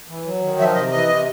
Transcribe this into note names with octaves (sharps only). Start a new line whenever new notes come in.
E3
F#3
D#3
F3 E5
C3 D#5
E3 D#5
C3